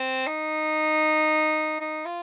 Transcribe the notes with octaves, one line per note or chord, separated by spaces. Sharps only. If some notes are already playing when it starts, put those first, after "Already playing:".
Already playing: C4
D#4
D#4
F4